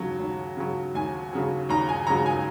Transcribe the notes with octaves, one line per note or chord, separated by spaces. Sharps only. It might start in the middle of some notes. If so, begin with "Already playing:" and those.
Already playing: D#2 C#3 F#3
D#2
C#3 F#3
D#2 G#5
C#3 F#3
D#2 A#5
G#5
C#3 F#3 A#5
G#5